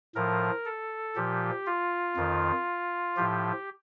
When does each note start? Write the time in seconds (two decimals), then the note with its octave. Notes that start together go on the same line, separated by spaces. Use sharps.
0.15 A2 F3 A#4
0.65 A4
1.16 A#2 F3 G4
1.66 F4
2.16 F2 D#3
3.17 A2 F3 G4